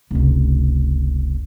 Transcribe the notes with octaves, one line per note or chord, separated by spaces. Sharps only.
F1 C#2